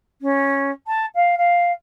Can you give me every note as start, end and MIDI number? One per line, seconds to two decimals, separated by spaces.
0.21 0.71 61
0.87 1.05 81
1.15 1.35 77
1.37 1.71 77